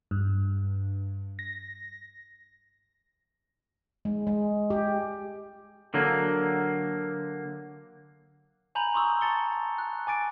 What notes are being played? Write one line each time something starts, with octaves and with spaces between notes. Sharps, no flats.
G2
A#6
G#3
G#3
G4
D3 F#3 A#3
G#5 A#5 B5 G6 F7 F#7
C6 C#6 D#6 E6
A5 A6 C#7 G7
F#6
G#5 D6 A6 D7